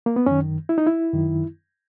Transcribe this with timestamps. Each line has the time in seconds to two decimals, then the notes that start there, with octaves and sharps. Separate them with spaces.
0.06 A#3
0.16 B3
0.26 F#2 D#3 C#4
0.69 E4
0.78 D#4
0.87 E4
1.13 F#2 D#3